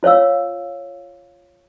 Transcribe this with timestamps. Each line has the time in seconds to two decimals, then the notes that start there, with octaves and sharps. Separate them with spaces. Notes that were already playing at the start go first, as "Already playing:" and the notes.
0.03 F4 C5 C#5 F5 E6